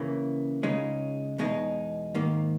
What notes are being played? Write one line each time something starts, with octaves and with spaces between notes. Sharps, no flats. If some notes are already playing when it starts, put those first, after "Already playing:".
Already playing: C#3 E3 A#3
C#2 C#3 G#3 D#4
E2 B2 G#3 D#4
G#2 D#3 A#3